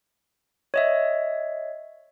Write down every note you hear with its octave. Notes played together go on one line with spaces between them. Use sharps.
C#5 D#5 E5